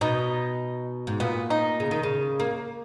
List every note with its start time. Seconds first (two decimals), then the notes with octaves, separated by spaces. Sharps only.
0.01 B2 D#4
1.07 G#2
1.20 A#2 B3
1.50 D#4
1.80 C#3
1.91 D#3
2.03 C#3
2.40 A#3